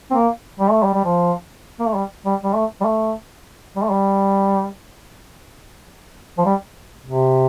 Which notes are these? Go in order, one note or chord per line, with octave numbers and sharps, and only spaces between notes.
C4
A#3
G3
A3
G3
G3
F3
A#3
A3
G3
G3
G3
A3
G3
A3
G3
A3
G3
F3
G3
C3